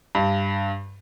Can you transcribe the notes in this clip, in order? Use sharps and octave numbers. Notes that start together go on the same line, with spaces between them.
G2